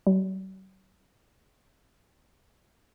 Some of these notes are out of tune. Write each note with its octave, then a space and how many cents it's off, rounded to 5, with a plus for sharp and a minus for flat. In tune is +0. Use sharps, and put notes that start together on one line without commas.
F#3 +45